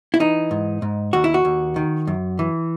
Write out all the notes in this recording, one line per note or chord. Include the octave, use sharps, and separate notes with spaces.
E4
E3 D#4
G#2
G#2
D#2 F#4
E4
F#4
D#2
D#3
F#2
E3